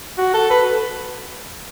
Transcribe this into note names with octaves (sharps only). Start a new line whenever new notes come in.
F#4
A4
B4